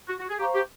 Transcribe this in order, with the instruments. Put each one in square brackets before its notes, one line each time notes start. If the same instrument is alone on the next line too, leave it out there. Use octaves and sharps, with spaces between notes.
[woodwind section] F#4
F#4
G#4
[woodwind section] G4 [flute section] C5 F5 A#5 C#6
[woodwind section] G4